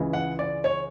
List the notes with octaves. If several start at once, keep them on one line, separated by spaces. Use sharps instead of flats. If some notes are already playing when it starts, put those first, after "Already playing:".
Already playing: C#2 C#3 E3
F#5
D5
C#5